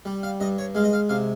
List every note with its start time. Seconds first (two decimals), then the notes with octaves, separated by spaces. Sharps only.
0.05 G3
0.23 F5
0.40 G2 D#5
0.58 C#5
0.75 G#3 F5
0.84 D#5
0.93 F5
1.09 C3 F5